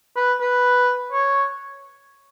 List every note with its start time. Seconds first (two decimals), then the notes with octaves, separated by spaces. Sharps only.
0.16 B4
0.40 B4
1.12 C#5